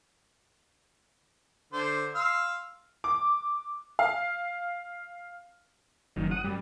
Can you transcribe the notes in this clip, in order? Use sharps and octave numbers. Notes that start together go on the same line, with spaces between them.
D3 C5
F5 C6 E6
D6
F5
F#1 F#2 D#3
F#5 D#6
F#2 G3